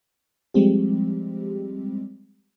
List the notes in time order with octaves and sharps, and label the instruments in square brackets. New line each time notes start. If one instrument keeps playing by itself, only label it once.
[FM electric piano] F3 G3 G#3 C4 G4